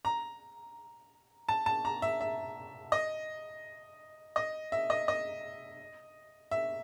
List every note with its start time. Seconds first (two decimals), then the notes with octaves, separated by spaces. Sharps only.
0.05 A#5
1.49 A5
1.66 A5
1.85 A#5
2.02 E5
2.21 E5
2.92 D#5
4.36 D#5
4.72 E5
4.90 D#5
5.08 D#5
6.51 E5